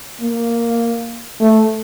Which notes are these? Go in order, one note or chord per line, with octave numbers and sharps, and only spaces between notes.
A#3
A3